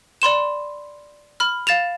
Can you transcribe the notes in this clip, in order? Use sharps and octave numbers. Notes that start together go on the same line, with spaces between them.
D5 B5 C6 E7
B5 F6
F5 A6 E7 F7